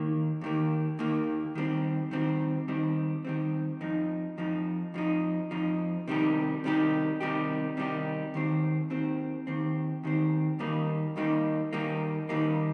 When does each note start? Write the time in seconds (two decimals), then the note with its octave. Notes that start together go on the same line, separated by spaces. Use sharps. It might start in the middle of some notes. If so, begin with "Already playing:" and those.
Already playing: D#2 D#3 A#3
0.41 D#2 D#3 A#3
0.99 D#2 D#3 A#3
1.55 D#3 G3 C4
2.11 D#3 G3 C4
2.68 D#3 G3 C4
3.25 D#3 G3 C4
3.81 F2 F3 D#4
4.38 F2 F3 D#4
4.94 F2 F3 D#4
5.51 F2 F3 D#4
6.08 C3 D#3 G3 D#4 G4
6.64 C3 D#3 G3 D#4 G4
7.21 C3 D#3 G3 D#4 G4
7.77 C3 D#3 G3 D#4 G4
8.34 D#2 D#3 C4
8.90 D#2 D#3 C4
9.47 D#2 D#3 C4
10.03 D#2 D#3 C4
10.59 D#2 D#3 G3 A#3 D#4
11.16 D#2 D#3 G3 A#3 D#4
11.73 D#2 D#3 G3 A#3 D#4
12.29 D#2 D#3 G3 A#3 D#4